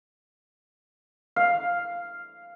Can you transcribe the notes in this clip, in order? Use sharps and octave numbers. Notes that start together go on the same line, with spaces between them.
F5